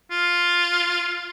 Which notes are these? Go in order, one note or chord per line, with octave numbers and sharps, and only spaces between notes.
F4